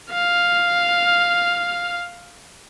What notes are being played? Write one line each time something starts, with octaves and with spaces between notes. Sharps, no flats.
F5 F6